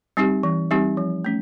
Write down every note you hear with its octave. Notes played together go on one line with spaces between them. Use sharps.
G3 C4 D#4 G4
E3
G3 C4 D#4 G4
F3
A3 C#4